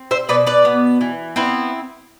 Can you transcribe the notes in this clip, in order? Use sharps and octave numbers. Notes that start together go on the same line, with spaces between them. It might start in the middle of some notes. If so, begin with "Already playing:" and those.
Already playing: C4
C5 E5
B2 B4 D5
B4 D5
B3
E3
B3 C4 E4